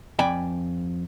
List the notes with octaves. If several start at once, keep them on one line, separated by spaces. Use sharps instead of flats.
F2 D5 G5 G#5 B5